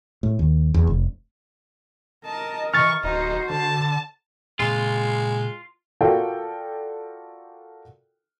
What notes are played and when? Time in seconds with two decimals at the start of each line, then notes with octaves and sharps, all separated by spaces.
0.23 A2
0.39 D#2
0.74 E2
0.87 F1
2.26 A#4 D#5 A5
2.74 E3 C#6 F6 A6
3.04 D1 D#4 F#4 C5
3.50 D3 A5
4.59 A#2 C#3 G#3 C4 F4
6.01 F4 F#4 A4 A#4 D5 G5